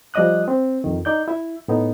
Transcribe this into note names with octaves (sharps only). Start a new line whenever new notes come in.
F3 G3 D5 D#5 D#6 F#6
C4
F2 D#3
D#4 D5 G6
E4 E5
A2 B3 D#4